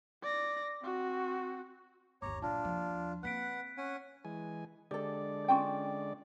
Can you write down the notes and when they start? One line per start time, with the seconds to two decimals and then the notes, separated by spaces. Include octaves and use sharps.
0.22 D5 A#6
0.82 C4 F#4
2.22 G1 D#2 C#5 A#5 D6
2.42 A#2 F#3 D4 F4 A5
2.65 D#2 F3
3.23 A#3 C4 B4 F#5 F#6 B6 D7
3.77 C#4 F#5 G#5
4.25 E3 G#3 G#5
4.91 D3 G#3 G4 A4 D5
5.48 C#4 F4 G5